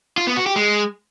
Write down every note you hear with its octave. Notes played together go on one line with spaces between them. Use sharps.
F4
B3
F#4
G4
G#3